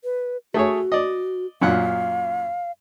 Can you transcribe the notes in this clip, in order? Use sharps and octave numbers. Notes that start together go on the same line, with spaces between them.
B4
A3 F#4 G#4 C#5
D5 D#5
F#2 A#2 F5 F#5